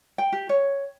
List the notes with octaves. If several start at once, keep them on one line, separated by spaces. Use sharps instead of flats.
G5
G4
C#5